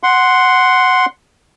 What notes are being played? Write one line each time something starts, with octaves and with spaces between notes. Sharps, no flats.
F#5 C6